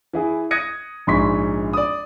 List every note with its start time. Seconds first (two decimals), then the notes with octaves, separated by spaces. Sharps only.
0.13 E3 E4 G#4
0.51 D#6 F#6 G#6 A#6 C#7 D#7
1.07 A#1 G#2 C6 C#6 B6
1.73 D5 D#6